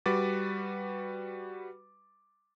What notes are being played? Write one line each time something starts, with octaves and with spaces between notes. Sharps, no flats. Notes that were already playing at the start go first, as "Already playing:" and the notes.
G3 F#4 B4 D6 A6